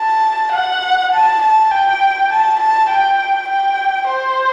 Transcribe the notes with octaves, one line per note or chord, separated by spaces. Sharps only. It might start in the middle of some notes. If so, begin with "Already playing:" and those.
Already playing: A5
F#5
A5
A5
G5
A5
A5
G5
G5
C5